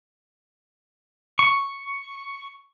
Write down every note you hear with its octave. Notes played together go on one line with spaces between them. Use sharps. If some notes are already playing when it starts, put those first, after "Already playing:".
C#6